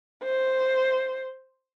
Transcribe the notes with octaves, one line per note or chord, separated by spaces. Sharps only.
C5